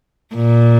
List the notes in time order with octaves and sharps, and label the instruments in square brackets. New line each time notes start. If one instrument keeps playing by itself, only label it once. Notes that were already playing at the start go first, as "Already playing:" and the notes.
[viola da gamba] A#2